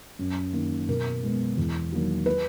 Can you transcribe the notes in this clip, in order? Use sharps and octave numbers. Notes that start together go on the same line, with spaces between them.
F#2
D#3 A#3
B2 A#4
G#3 B3
E2
D#3 F#3 A#3
B4